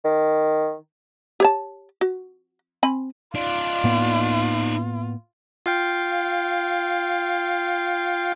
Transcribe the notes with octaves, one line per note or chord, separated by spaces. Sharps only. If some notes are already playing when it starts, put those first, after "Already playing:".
D#3
G4 C#5 A5
F#4
C4 G#5 B5
D#4 F4 D5
A2 A#3 B3
F4 F5 G5